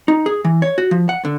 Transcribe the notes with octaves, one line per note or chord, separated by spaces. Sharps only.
D#4
G#4
E3
C#5
F#4
F3
F#5
D3